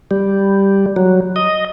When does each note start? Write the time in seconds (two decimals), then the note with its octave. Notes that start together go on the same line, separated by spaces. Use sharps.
0.11 G3
0.96 F#3
1.36 D#5